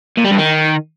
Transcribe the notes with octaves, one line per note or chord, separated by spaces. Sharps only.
A#2
G3
G2
D#3